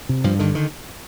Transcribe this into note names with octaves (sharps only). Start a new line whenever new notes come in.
C3
G2 F3
D3 D#3
D#3